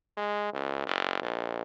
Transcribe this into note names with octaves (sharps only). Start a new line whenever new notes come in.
G#3
C#2
F#1
A#1